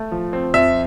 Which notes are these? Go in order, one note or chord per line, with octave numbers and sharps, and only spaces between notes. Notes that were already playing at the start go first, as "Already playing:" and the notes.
Already playing: A3
F3
C4
F2 E5